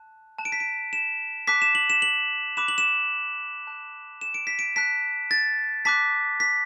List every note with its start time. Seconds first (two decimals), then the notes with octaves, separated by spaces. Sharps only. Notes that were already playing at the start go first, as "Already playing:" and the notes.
Already playing: A5 F#6
0.38 A5 F#6 E7
0.45 D7
0.52 B6
0.60 D7
0.93 E7
1.47 A5 D6 F#6 B6
1.62 E7
1.75 F#7
1.90 E7
2.02 F#7
2.57 B5 D6 F#6 E7
2.68 F#7
2.78 E7
3.67 A5 F#6
4.21 E7
4.34 D7
4.47 B6
4.59 D7
4.76 A5 F#6 B6
5.31 A6
5.85 A5 D6 F#6 B6
6.40 B6